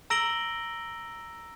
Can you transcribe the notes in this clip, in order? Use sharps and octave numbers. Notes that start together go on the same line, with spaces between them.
A#5 E6 A#6 D7 F#7 G7